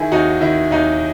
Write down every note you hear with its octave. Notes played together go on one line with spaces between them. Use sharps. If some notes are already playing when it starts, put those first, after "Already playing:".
Already playing: D#3 E4 G#4
D#2 D#4 F#4
D#3 E4
D#2 D#4